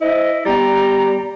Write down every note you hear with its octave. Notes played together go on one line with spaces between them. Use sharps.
E4 C5 D#5
G3 B3 D5 G5 A#5 A6